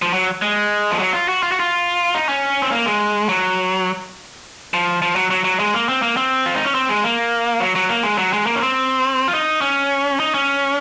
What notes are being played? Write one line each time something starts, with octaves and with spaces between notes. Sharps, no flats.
F3
F#3
G#3
F3
F#3
F4
F#4
F4
F#4
F4
D#4
C#4
C4
A#3
G#3
F#3
F3
F3
F#3
F#3
F#3
G#3
A#3
C4
A#3
C4
F4
D#4
C#4
C4
G#3
A#3
F#3
F#3
A#3
G#3
F#3
G#3
A#3
C#4
C4
F4
D#4
C#4
D#4
C#4